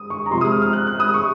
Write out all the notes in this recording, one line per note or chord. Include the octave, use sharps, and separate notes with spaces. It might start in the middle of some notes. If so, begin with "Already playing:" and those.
Already playing: D#6
C#6
A#5
C3 F3 G#3 C6
D#6
F6
F6
F#6
F#6
D#6
C#6